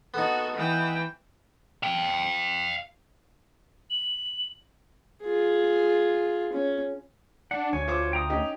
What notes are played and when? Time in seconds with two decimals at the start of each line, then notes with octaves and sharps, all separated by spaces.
0.14 B3 D#4 F#4 A4
0.56 E3 G5
1.83 F5 G5
3.90 F#7
5.23 F4 G#4
6.53 C#4
7.51 D4 F#5
7.73 D2 C#5 G#5
7.88 F4 C5 D6
8.13 G5 A#5 D#6
8.30 C#4 D#4 G4